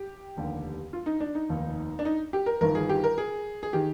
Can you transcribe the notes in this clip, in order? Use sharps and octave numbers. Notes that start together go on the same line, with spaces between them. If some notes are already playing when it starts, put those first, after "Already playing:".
Already playing: G4
F1 D#2 D3
F4
D#4
D4
D#4
F1 D#2 D#3
D4
D#4
G4
A#4
G1 G2 D#3 A#4
G#4
G4
A#4
G#4
G#4
D#3 G4